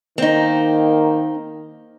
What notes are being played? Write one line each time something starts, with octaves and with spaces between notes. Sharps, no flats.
D#3 A#3 C4 D#4